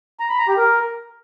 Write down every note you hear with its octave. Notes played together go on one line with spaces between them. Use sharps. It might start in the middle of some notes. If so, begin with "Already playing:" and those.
A#5
B5
A#5
G4
A#4